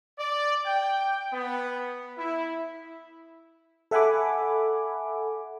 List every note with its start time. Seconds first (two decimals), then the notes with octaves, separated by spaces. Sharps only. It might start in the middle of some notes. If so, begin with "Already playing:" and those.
0.19 D5
0.65 G5
1.33 B3
2.18 E4
3.91 A4 E5 F#5 G#5 B5 D6